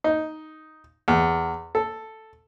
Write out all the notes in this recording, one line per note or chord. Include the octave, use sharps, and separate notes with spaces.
D#4
E2
A4